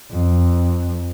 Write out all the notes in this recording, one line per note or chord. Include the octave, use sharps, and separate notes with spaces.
F2